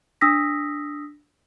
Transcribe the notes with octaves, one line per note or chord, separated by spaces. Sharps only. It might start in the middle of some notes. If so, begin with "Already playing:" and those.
D4 D#6 E6 A#6 B6